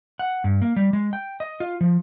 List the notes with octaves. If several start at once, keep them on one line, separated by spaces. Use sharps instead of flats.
F#5
G2
A#3
G3
G#3
G5
D#5
F4
F3